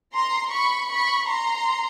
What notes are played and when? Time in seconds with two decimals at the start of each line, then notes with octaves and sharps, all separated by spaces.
0.15 A#5 C6
0.52 B5 C#6
0.90 B5 C#6
1.28 A#5 C6